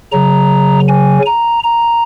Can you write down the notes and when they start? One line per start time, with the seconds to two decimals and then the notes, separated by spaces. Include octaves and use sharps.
0.12 C#3 F#3 A#5
0.88 G#5
1.26 A#5
1.64 A#5